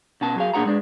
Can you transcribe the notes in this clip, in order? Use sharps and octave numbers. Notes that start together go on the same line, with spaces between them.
B2 C#4 A5
F#3 G#4 F5
A#2 D4 G#4 F#5 A#5
G#3 D4